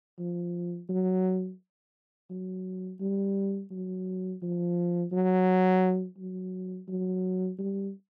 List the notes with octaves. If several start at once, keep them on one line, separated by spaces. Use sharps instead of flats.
F3
F#3
F#3
G3
F#3
F3
F#3
F#3
F#3
G3